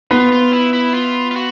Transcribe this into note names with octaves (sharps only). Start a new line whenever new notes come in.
B3 F4
F4
E4
E4
F4
F4
F#4